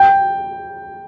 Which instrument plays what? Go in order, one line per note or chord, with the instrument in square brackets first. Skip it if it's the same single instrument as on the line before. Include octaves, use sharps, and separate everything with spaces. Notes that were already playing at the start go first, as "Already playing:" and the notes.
Already playing: [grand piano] G5